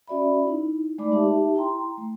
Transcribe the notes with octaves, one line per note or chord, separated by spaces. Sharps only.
C#4 F#4 D5 E5 B5
D#4 E4
G#3 A3 D#4 D5 B5 D6
D#4 G4 E5 A5
E4 G5 A#5 C6
A3